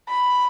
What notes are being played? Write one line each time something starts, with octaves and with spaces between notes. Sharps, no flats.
B5